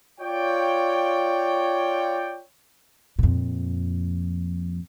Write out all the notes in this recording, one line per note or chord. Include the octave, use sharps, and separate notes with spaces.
F4 C#5 D5 G5
F2 A#2